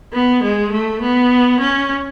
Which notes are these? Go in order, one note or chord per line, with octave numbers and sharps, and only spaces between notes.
B3
G#3
A3
B3
C#4